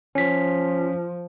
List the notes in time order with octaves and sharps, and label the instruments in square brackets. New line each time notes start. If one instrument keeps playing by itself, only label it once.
[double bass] F3 [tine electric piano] C#4 B6